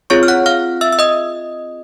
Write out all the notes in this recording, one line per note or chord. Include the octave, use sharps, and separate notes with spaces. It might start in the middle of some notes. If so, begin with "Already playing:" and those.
C4 F4 G#4 C#5 C#6
F6
F#5 F#6
F5 F6
E5 E6
E6
D#5 D#6